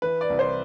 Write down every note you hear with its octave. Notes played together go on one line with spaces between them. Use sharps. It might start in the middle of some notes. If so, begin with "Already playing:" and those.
E3 B4
D5
C2
C5